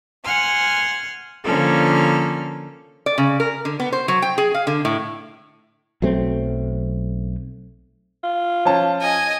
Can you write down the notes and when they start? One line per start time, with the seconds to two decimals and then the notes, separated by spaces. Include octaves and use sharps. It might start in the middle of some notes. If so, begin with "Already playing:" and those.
0.25 F#5 G#5 C6 F6
1.45 D3 F3 A#3 C#4 A4 F6
3.06 D5
3.18 C#3
3.40 A#4
3.65 D3
3.80 B3
3.92 C5
4.08 F#3
4.22 G5
4.38 G#4
4.54 F5
4.67 D3
4.85 A2
6.02 B1 F#3 A3 C4
8.24 F4
8.65 F3 C#4 A5
9.01 D#5 G#5